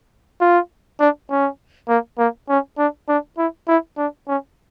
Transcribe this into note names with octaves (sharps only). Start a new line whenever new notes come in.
F4
D4
C#4
A#3
A#3
C#4
D4
D4
E4
E4
D4
C#4